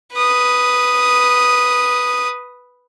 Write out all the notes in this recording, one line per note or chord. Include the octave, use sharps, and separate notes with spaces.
B4 D#6